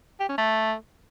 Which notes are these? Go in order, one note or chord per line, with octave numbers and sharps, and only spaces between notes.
G4
C#4
A3